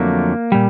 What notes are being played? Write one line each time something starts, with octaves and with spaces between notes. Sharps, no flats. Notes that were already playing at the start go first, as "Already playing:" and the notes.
Already playing: F2 D3 F#3 A3 A#3
A#2 G3